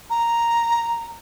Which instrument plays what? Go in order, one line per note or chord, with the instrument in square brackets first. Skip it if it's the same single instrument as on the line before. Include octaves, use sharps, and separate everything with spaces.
[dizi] A#5